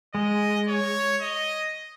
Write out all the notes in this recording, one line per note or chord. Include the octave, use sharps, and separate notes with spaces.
G#3 D#5
C#5
D#5